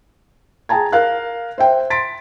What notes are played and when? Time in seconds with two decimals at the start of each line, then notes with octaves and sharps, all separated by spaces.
0.69 G#4 G5 A5 A#5 G#6
0.92 A#4 F5 F#6
1.58 C5 E5 G5
1.90 C6 A6 B6 D7